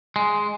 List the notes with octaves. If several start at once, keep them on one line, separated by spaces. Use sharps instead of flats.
G#3